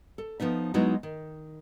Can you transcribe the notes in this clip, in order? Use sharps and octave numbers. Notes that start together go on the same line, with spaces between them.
A4
F3 B3 D#4 E5
F#3 G#3 B3 D#4 E4 F#4
D#3